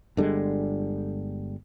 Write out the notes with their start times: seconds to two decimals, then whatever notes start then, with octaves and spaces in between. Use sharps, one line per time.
0.17 G1 D3 G3 G#3